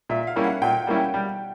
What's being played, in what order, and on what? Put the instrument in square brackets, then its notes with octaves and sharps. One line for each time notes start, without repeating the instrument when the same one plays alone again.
[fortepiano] A#2 [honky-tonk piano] E5
[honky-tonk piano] F5
[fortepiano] G3 A#3 C#4 E4
[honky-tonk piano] F#5
[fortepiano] A#2 [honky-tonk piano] G5
[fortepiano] G3 A#3 C#4 E4
G3